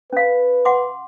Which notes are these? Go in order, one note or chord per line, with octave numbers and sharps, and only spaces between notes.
C#4 B4 F5
F#5 C6 D6